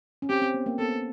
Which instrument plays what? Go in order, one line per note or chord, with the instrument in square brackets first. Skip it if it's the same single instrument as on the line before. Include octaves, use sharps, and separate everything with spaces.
[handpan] C#4
[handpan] C4 [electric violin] G4
[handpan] C4
B3
A#3
[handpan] B3 [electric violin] A4